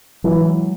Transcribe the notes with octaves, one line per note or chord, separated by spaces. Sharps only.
E3 F#3 G#3